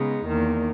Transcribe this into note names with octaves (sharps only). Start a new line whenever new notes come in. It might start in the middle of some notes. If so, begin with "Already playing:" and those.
Already playing: C#3 G#3 B3 D#4
E2 D#3 A#3